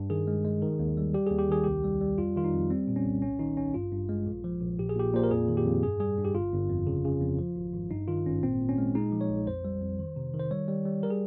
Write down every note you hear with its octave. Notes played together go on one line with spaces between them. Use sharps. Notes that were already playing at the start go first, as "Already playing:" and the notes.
Already playing: G2
D#3 G#4
G#3
G#3
D#3
D#2
G3
G3 G4
D#2 G#4
G4
D#3 G#4
C2 G4
G3
G3
F2 F4
D#3 F4
D#4
F2
G3 C4
A#2
C#4
C2
G#1 C#4
D#3 D#4
G#1 C#4
G2 F4
G2
G#3
A#1
F3
A#1
A#2 G4
G#4
A#2 G4
A#2 C5
A#4
F2 G#4
D#3
G4
F2
G2 G#4
G3 G#4
G2
G4
G1 F4
G1
F2
C#3
C#3
F2
F3
G#1
G#1
G2 D#4
D#3 F4
G#1 C#4
A#2 C4
A#2
C#4
G#3
G#3 D#4
F3
C#5
A#1
F2 C5
G3
F2
D#3
C3
D#3
C5
G3 C#5
G3
G3
G3 A#4
G#4